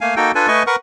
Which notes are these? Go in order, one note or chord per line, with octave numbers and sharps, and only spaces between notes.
A3 A#3 F5 G#5
A#3 D#4 F#4 A4 G5
D4 F4 A4 B4 G#5
A3 B4 D#5 G#5 C#6
A#4 B4 F#5 C#6